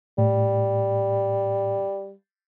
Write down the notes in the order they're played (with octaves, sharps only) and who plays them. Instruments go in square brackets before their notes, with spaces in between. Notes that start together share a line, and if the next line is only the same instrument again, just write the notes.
[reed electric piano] A2 [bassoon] G3